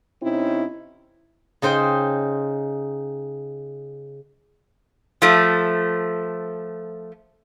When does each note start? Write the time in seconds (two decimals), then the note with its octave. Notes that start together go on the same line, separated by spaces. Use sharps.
0.22 C3 C4 C#4 D#4 E4
1.62 C#3 D#4 C5 G5
5.22 F3 A3